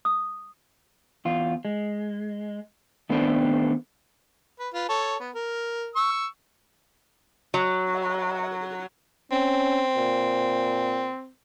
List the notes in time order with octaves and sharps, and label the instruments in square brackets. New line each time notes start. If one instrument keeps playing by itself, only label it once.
[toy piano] D#6
[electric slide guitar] E2 F4
G#3
D#3 A3 B3 C4 D4 A4
[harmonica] B4
F4 B4
A4 C#5
B3
A#4
C#6 E6
[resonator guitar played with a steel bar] F#3
[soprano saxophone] C4 [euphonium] C#4
[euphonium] A#2